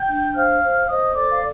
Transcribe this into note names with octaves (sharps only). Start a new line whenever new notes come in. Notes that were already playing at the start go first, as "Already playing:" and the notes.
Already playing: G5 G6
D4
C5 F5 F6
C5
C5 D#5 D#6
A4 D5 D6
F5